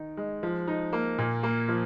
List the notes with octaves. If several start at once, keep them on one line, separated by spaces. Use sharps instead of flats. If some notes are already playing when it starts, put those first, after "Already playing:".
Already playing: D#3 D#4
G#3
F3
D#4
A#3
A#2
A#3
F3